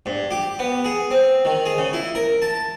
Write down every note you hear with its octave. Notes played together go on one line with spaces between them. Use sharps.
G2
G4
B3
G#4
C4
D#3
G#4
C#3
E4
A#4
A5